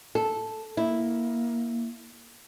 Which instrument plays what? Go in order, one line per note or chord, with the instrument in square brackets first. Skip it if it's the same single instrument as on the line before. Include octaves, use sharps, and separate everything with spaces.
[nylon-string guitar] A4
[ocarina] A#3 [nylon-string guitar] E4